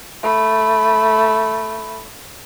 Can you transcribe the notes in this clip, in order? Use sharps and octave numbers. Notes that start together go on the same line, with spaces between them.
A3 B5